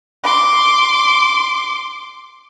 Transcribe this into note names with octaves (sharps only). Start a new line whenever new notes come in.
C6 D6